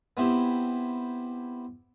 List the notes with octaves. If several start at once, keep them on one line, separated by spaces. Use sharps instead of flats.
B3 C4 E4 G4